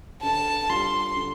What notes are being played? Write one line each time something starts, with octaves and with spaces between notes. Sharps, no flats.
D3 A5
G3 D4 F4 C6
D3